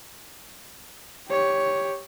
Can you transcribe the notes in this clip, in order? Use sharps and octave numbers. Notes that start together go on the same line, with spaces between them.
G4 C#5